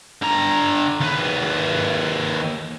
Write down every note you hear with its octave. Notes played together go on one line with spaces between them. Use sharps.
D3 A#5
D#2 B4